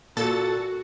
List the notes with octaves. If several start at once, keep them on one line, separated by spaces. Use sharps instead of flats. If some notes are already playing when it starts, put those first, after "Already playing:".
A#2 F#4 A4 A6